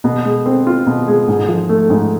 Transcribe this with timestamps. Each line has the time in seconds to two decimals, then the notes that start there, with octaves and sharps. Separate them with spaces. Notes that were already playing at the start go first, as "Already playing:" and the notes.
0.04 B2
0.25 G#3
0.46 C4
0.67 F4
0.87 B2
1.08 G#3
1.28 G#2
1.48 F3
1.69 A3
1.90 G#2